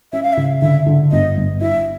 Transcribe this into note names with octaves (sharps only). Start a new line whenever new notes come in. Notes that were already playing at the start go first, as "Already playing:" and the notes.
C#4 E5
F5
E5
C#3
D3 E5
D3
G1 D#5
G1
E4 E5